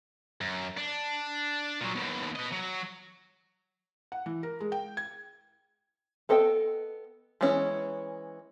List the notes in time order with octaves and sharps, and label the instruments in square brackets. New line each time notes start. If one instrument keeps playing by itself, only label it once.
[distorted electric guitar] F#2
D4
A#2 F#3
D#2 B2
B3 D#5
F#3
[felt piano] F#5
E3
A#4
G#3
G5
G#6
[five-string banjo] B3 A4 D#5 F#5 G5
E3 G#3 B3 C#4 E4